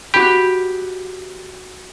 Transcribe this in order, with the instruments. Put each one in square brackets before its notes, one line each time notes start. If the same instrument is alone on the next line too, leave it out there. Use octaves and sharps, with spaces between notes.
[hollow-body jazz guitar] F#4 B5 [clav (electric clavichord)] G4